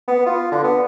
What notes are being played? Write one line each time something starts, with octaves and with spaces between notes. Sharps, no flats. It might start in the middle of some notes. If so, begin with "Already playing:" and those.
B3
F4
D3
B3